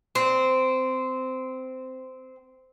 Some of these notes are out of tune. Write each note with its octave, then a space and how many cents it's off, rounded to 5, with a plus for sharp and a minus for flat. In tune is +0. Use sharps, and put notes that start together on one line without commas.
C4 -15